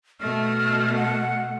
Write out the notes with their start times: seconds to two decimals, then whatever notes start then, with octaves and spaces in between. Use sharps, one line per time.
0.21 B2 A3 F6
0.97 F#5